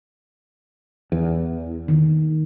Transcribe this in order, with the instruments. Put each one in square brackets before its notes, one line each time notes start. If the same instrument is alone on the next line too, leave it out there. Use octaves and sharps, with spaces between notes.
[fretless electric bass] E2
[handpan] D#3